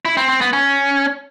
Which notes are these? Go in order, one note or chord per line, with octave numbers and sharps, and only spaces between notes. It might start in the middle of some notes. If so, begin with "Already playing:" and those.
E4
C4
C4
B3
C#4